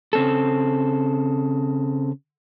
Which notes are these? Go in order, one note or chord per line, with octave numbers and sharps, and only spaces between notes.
C#3 C4 A4